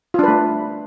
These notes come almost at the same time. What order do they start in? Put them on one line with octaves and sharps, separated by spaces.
F4 D4 B4 A3